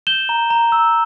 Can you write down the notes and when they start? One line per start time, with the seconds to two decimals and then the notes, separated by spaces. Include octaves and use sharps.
0.07 G6 E7 G7
0.29 A#5
0.50 A#5
0.72 E6